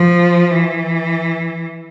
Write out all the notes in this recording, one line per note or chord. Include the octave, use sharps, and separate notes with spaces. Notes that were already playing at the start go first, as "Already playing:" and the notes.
Already playing: F3
E3